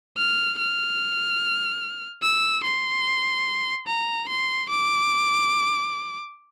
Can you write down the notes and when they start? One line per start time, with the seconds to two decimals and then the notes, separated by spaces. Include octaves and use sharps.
0.17 F6
0.58 F6
2.22 E6
2.64 C6
3.87 A#5
4.29 C6
4.69 D6